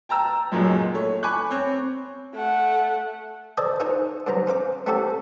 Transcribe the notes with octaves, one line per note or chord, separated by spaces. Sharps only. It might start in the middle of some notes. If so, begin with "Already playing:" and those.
G5 A5 A#5 E6
C#2 F#2 A#2 F#3 G#3 A#3
A3 C#5
G#5 B5 C#6 D6 F#6
C4 C#5
A3 F#5
G#4 A4 C5 D5 D#5 G#5
D#4 F4 G#4 A#4 C5 C#5
G2 C#3 F#3 C5 A#5
C#4 C5 F5 D6
A3 C4 C#4 F#4 G4 A4